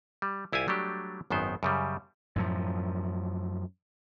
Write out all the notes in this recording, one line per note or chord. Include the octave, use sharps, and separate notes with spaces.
G3
C2 E4 F4 G4 G#5
F#3 G3 A3 D4 G4
G#1 F#2 D#3 B3 C5
F#2 C#3 G3
F#2 A2 F3